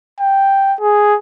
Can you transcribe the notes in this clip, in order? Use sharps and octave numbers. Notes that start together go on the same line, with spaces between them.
G5
G#4